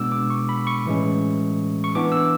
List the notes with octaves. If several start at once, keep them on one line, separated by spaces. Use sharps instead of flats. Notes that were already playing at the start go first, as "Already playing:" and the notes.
Already playing: B2 G#3 B3 D4 D6 E6
D6
C#6
B5
C#6
A2 E3 G#3 C#4
C#6
E3 B3 D4 D6
E6